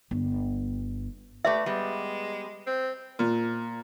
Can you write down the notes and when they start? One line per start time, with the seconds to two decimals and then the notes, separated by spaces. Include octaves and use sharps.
0.11 G1
1.45 A3 G4 B4 D5 E5
1.66 G3 G#3 B3
2.67 C4
3.19 A#2